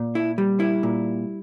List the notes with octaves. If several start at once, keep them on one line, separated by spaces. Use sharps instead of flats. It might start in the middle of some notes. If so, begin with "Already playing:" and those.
Already playing: A#2
E4
G3
E4
A#2